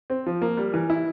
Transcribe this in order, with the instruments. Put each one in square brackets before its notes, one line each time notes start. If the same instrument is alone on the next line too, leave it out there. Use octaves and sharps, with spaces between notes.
[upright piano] C4
F3
A#3
G3
E3
E4